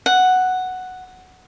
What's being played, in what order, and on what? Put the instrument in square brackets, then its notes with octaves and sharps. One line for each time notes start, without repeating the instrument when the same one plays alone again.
[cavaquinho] F#5